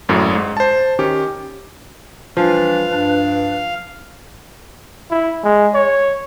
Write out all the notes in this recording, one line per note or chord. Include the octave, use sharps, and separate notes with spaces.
G#1 F#2 A2
G#2
C5 A5
D#3 C#4 G4
E3 F3 G3 D4 B4 F5
G2 D4
E4
G#3
C#5